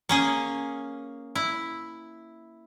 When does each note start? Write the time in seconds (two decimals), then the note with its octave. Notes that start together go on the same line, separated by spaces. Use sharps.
0.09 A#3 C#4 G#4
1.35 E4